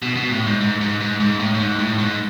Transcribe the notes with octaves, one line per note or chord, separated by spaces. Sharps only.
B2
B2
A2
G#2
G#2
G#2
G#2
G#2
A2
A2
G#2
A2
G#2